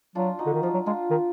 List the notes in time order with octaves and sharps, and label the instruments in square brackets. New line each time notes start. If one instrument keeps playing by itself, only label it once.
[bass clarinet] F#3 [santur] D4 F4
[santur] D#4 F#4
[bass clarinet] D3
D#3
[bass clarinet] F3 [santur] D4 F4
[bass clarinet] F#3
[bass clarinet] G#3 [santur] D4 F4
[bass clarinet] D#3